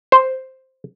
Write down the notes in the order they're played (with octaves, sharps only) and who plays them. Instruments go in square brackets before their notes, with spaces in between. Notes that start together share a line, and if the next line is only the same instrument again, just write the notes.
[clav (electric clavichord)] C5